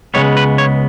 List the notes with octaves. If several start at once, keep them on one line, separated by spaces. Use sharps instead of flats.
C#2 C#3 E3 G#3 B3 C#5
B4
C#5